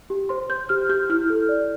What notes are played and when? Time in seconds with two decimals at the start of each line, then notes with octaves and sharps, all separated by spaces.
0.10 G4
0.29 C5 C6
0.49 C5 G6
0.69 G4 F6
0.89 G4 G6
1.09 E4 F6
1.30 A4
1.49 D5